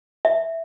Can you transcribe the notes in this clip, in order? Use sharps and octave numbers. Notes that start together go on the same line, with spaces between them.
E5